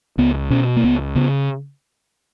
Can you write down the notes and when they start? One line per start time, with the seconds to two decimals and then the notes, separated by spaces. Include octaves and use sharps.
0.18 C#2 B3
0.50 B2 C#4
0.76 A#3
0.83 C#2 B3
1.15 C#3 B3